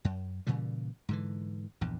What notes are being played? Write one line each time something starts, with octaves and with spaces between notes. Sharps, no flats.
F#2
A#2 C#3 E3 G3
G#2 D3 E3
A#1 E2 G2